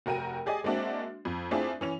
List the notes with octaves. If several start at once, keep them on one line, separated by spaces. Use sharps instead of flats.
F1 F#4 A#4 G5 D#7
G4 G#4 D5 D#5 G#5
G#3 A#3 C4 D4 F#4 E5
F2
A3 C4 D4 E4 F4 G#4
E3 C#4 F7